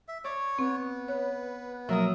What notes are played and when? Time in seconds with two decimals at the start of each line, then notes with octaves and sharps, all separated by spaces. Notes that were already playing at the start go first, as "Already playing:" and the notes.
0.08 E5
0.24 C#5 D5
0.59 B3 C4
1.08 B4 C#5
1.89 B2 F3 F#3 A#3 A#4 E5 D#6